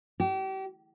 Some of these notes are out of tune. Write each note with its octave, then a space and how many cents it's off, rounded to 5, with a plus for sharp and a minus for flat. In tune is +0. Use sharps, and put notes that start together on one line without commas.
G4 -35